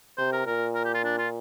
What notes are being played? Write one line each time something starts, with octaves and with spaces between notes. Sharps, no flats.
C3 C5
A#4
A#2 A#4
A#4
G4
F4
D4
F4